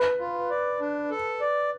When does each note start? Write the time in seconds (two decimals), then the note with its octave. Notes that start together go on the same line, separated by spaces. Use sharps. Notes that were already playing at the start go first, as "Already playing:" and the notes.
Already playing: B4
0.20 F4
0.50 D5
0.80 D4
1.11 A4
1.40 D5